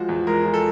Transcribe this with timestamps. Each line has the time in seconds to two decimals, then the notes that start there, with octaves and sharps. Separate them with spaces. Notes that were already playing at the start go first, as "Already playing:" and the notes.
Already playing: F3 G#3 F#4
0.09 E2
0.27 G#3 A#4
0.45 F3
0.54 A4